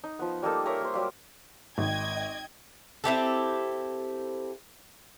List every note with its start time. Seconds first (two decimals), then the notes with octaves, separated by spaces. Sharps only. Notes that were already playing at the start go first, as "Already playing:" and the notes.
0.04 D#4
0.19 F3 B3
0.42 G3 A#3 D#4 A4
0.66 A#4 C#5 E5 A#5
0.81 A#3 C5
0.94 F#3 G3 G4 F5
1.78 G#1 D#5 G5 G#6
3.04 C4 E4 G4 A4